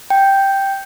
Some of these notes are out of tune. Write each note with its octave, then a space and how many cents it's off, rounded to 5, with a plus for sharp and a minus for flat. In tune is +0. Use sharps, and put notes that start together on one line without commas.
G5 +0